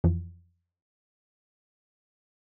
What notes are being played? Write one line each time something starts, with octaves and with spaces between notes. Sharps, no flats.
F2 E3 F3